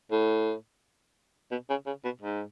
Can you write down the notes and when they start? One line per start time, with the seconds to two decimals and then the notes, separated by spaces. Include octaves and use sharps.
0.11 A2
1.51 B2
1.70 C#3
1.86 C#3
2.04 B2
2.22 G#2